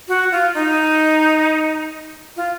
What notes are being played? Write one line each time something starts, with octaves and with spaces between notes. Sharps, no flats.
F#4
F4
D#4
F4